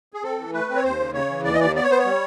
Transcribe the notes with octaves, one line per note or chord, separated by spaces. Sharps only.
G#4
C4 A4
E3
A3 B4
C4
C#5
D#2 C5
C#3
C#3 C#5
E3
D#2 D5
D#5
D#2 D5
B3 D5
C#5
B3 C5
C#5
G3